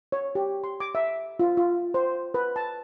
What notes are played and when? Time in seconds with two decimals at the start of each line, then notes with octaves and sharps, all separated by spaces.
0.12 C#5
0.35 G4
0.64 C6
0.80 D6
0.95 E5
1.40 F4
1.57 F4
1.94 C5
2.34 B4
2.56 A5